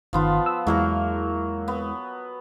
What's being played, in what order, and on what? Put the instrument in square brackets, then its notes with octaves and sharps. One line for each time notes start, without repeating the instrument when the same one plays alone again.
[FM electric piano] G1 D#3 [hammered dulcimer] F3 B3 F4
[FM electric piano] E6
[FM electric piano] E2 G#3 E4 [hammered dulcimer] F#3 A#3 A#4
[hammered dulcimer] B3